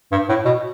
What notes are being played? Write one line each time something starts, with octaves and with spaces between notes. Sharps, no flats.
G2
A2
B2